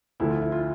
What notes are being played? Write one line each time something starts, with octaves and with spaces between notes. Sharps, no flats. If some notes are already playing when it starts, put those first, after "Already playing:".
D2 D3 F3 A3 E4
F4
E4
F4